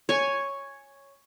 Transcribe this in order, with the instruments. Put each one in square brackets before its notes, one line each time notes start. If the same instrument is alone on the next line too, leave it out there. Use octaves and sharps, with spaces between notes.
[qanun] C#5 G#5